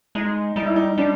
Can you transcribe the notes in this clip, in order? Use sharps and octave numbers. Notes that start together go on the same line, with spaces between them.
G#3 D#4
G3 D#4
E4
D#4
G3 D4